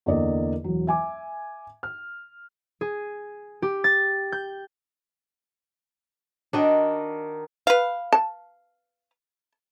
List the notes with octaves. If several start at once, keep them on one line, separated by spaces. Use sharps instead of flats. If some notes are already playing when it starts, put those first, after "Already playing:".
E2 D3 A#3 D5 D#5
E1 F#3
E5 G#5 D6
F6
G#4
G4
A6
G6
D#3 D4 F#4 D#5
B4 F5
A5